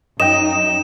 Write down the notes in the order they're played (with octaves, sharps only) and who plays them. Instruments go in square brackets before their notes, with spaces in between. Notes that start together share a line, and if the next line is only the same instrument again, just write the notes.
[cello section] F#2 D#4 [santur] D#5 G5 [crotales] E7